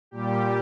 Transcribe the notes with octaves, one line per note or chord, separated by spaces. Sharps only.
A#2 G3 G4